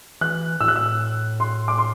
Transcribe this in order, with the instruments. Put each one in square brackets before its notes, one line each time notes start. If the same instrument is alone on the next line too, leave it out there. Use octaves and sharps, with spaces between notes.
[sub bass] E3 [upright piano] F#6
[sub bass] A2 [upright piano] E6
[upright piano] F#6
E6
C6
D6
C6